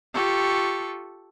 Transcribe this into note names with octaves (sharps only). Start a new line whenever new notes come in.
F4 G4 A4 C#6